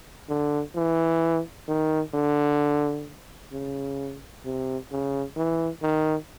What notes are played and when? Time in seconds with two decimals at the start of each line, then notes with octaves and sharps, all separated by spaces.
0.29 D3
0.76 E3
1.68 D#3
2.14 D3
3.53 C#3
4.45 C3
4.91 C#3
5.37 E3
5.83 D#3